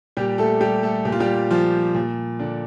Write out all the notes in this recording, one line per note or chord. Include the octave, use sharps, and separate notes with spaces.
A#2 G3 G4
A3 A4
G3 G4
A3 A4
A#2 G4
F4
G3 G4
F3 F4
A#2
D3 D4